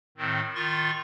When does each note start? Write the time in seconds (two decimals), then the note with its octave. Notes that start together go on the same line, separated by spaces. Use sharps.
0.17 A2 D#3 C4
0.55 D#3 F4 C6 C#6 A6